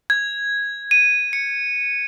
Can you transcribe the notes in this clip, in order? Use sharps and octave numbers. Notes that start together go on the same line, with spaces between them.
G#6
D#7
C#7